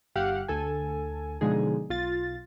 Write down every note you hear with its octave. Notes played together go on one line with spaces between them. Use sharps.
G1 G4 F5 F#5
D2 A4 G#5
B2 D3 F3 G#3 D#4 G#4
B1 F4 A6